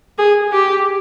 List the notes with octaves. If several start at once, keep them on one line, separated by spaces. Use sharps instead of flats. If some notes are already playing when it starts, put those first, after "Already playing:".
G#4
G4